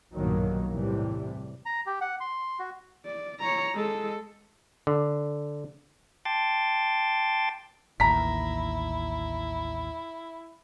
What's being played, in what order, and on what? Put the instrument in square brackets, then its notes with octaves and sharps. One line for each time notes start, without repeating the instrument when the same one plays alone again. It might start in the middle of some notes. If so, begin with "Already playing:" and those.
[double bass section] B1 G2 A#2 D#3 F#3 A#3
E2 A2 C3 E3 G3
[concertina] A#5
G4
F#5
C6
F#4
[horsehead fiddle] D5
C#5 A#5
G#3 A4
[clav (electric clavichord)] D3
[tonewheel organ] G5 A5 C6 D6 A6
[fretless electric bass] A1 D#2 [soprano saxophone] E4 [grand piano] A#5 B6